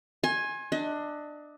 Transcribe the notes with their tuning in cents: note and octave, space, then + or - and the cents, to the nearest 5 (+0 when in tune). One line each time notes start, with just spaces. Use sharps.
G#5 +0 C6 +40
D4 +20 D#5 +35